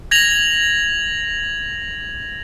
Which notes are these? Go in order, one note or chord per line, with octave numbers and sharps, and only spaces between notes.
G#6 A#6 F7 F#7